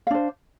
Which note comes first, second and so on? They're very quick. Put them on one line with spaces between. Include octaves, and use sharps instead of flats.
F5 D4 C5